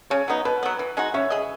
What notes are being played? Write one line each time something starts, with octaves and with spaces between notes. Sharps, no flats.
C#3 C#5
F#3 B3 D#4
B2 B4
F#3 B3
E3
G#3 D#4 F#4
C#4 C#5 E5
G#4 D#5